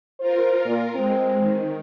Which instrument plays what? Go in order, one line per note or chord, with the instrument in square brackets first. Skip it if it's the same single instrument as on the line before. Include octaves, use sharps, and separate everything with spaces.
[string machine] F4 A#4 [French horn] C5
[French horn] A#2
[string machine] G#3 [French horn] C4
[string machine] D#3